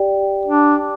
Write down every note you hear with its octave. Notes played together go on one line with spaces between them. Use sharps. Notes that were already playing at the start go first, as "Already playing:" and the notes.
Already playing: G4 D5 G5
D4